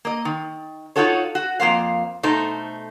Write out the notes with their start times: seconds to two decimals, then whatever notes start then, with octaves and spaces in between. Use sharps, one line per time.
0.05 A#3 D#5
0.25 D#3
0.96 D#4 F4 F#4 A4 C#5
1.35 F#4
1.60 F2 A#3 C5 F5
2.23 B2 A3 D#4 C5